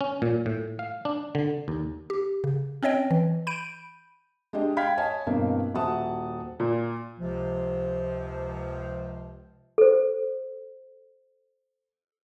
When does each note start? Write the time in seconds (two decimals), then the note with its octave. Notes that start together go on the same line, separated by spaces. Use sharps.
0.01 C#4
0.22 A#2
0.46 A2
0.79 F5
1.05 D4
1.35 D3
1.68 D#2
2.10 G4
2.44 C#3
2.83 C4 C#4 C#5 D#5 G5
3.11 E3
3.47 B5 G6 D7 D#7
4.53 G#3 D4 G4 D#5
4.77 F5 G5 B5 F6 G#6 B6
4.98 C#5 D#5 G#5 A5
5.27 E2 G2 B2 A#3 C4
5.75 D#1 F#4 E5 F#5 A5 D#6
6.60 A#2
7.19 C#2 C3 F3
9.78 A4 C5